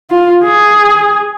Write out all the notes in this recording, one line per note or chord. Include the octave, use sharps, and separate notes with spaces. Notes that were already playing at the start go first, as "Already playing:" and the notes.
F4
G#4